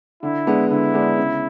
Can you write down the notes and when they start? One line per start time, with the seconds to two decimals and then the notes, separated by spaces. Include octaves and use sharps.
0.23 D3 E4
0.47 G#3 B3 D4
0.71 D3 E4
0.94 G#3 B3 D4
1.18 C#3